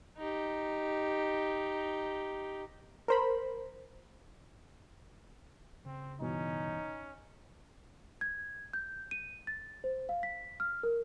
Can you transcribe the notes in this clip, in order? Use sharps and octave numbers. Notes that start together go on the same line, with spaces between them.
D#4 G4
A#4 C5 B5
C#3 C4
G2 B2 E3 C#4 D#4
G#6
G6
D#7
A6
C5
F5
B6
F6
A#4